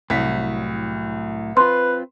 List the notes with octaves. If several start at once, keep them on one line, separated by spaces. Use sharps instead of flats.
C2 A2 F#3 B6
C4 F4 B4 C6